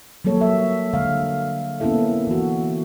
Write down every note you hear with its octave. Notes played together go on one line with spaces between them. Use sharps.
F#3 G3 A#3 A4 C#5
E5
D3 G#3 F5
A#3 B3 C#4 E4 A4 E5
E3 F#4